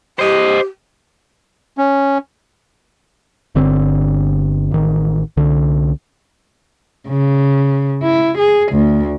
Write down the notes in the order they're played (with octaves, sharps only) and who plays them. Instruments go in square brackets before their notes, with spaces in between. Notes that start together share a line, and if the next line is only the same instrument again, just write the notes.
[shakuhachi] G4 [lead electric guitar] C5 D#5
[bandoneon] C#4
[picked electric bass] G1 D3 C4
A1 D#3
C2 D3
[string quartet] C#3
E4
G#4
D2